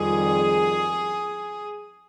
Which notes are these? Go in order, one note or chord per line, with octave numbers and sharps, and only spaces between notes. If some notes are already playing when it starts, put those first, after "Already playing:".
Already playing: F2 D#3 G3 G#4